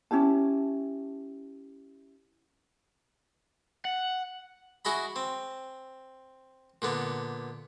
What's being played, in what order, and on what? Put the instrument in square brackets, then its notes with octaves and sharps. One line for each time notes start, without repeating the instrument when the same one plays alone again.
[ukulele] C#4 E4 G4 A5
[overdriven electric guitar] F#5
[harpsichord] E4 F#4 G#4 D#5 B5
C4
A#2 D3 B3